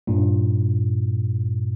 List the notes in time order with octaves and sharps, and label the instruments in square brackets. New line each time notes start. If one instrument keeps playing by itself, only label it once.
[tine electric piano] G2 A#2